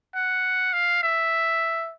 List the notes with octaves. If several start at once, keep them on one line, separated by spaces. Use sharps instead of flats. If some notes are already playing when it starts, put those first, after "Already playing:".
F#5
F5
E5